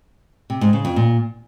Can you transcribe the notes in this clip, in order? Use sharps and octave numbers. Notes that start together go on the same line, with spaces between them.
C3
G#2
C#3
F2
A#2